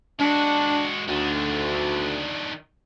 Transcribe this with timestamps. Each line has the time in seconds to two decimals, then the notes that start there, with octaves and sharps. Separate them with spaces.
0.20 G#3 D4 F#4
1.08 D2 D#3 D4